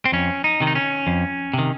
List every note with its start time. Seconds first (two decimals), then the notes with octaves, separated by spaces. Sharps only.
0.05 C4
0.12 F2 C#4
0.44 D#4
0.60 C3 D#3
0.67 D#4
0.75 C#4
1.07 F2
1.54 C3 D#3